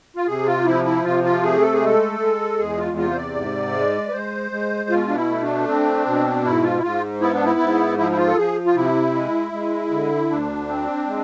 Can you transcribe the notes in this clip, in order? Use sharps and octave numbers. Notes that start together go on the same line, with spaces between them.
F4
C3 G#4
F4
F3 E4
E4
C3 F4
F4
A3 G#4
A4
G#4
G#3 A4
G#3
E2 G#4
F4
C3 F4
C5
D5
G#2
G#3
B4
G#3 C5
G#3
B2 F4
D4
E4
A3
D4
C4
B2
G#2 E4
F4
E4
G#2 F4
B3 E4
D4
E4
G#2
F3 E4
E4
F4
A4
F3 G#4
F4
C3 E4
G#3
G#3
D3
D2 D4
C4
G#3